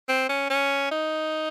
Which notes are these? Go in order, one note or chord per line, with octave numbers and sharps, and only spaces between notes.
C4
C#4
C#4
D#4